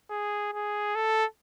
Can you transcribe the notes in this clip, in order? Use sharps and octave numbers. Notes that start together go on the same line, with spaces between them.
G#4
G#4
A4